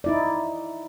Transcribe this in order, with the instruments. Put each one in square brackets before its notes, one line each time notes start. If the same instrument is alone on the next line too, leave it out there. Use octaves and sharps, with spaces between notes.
[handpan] D#4 E4 D5